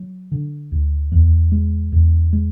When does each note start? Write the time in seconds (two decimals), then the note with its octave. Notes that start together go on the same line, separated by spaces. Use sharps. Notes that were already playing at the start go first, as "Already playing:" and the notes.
Already playing: F#3
0.32 D3
0.72 D2
1.12 E2
1.52 G#3
1.92 E2
2.33 G#3